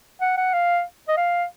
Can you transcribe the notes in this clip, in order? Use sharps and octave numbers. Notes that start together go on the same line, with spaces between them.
F#5
F#5
F5
D#5
F5